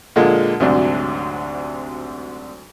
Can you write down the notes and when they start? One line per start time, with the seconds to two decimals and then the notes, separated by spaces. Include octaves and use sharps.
0.16 A#2 D3 G#3 A#3
0.60 D2 G#2 C3 F#3 D4